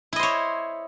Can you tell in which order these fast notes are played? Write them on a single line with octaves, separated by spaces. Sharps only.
E4 D#5 C5 C#5